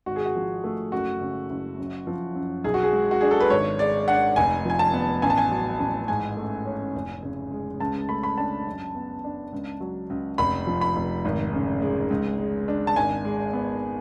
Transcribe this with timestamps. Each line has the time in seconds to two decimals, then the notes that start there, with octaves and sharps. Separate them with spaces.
0.06 G#1 F#4
0.16 G#4
0.25 F#4
0.35 F3
0.64 A3
0.92 F#1 F#4
1.21 C#3
1.50 F#1
1.78 F#2
2.07 F3
2.36 F#2
2.64 B1 G#4
2.74 F#4
2.83 G#4
2.93 G#3
3.11 F#4
3.21 D4 G#4
3.31 A4
3.40 B4
3.50 G#1 C#5
3.79 G#3 D5
4.07 D4 F#5
4.36 F1 G#5
4.65 F3 G#5
4.79 A5
4.94 B3
5.22 A1 G#5
5.30 A5
5.37 G#5
5.51 F#3
5.80 A1
6.08 G#2 G#5
6.37 A3
6.66 C#4
6.94 F1
7.23 C#3
7.52 G#3
7.80 C#2 A5
8.09 A3 B5
8.23 B5
8.38 D4 A5
8.66 F#2
8.95 B3
9.24 D4
9.52 C#2
9.80 F#3
10.10 C#2
10.38 F1 B5
10.67 F3
10.81 B5
10.96 F1
11.25 G#1
11.53 C#3
11.82 G#3
12.10 C#2
12.39 G#3
12.68 D4
12.87 A5
12.96 G#1 G#5
13.25 G#3
13.53 B3